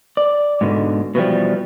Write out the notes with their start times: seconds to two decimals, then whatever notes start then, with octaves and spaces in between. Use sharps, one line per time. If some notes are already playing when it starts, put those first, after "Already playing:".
0.17 D5
0.61 G#2 B2 D3
1.15 B2 E3 F3 G3